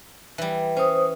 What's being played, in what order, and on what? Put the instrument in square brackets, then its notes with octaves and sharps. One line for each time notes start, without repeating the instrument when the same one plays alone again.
[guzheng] E3 G3
[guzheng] C#4 [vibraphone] C5 D#6